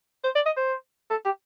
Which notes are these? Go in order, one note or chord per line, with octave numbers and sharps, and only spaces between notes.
C5
D5
D#5
C5
A4
G4